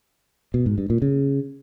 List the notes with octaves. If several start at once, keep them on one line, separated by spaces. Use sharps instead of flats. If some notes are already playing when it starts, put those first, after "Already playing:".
B2
G#2
G2
A#2
C#3